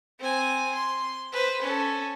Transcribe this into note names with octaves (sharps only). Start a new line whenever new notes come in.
C4 G#5
C6
B4 C5
C#4 A4